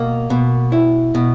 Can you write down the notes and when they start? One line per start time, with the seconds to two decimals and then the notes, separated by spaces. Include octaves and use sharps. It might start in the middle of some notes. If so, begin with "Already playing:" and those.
Already playing: B2 A#3
0.30 B2
0.72 E4
1.15 B2